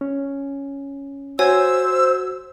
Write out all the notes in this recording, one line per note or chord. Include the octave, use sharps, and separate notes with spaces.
C#4
F#4 C5 C#5 G#5 E6 G#6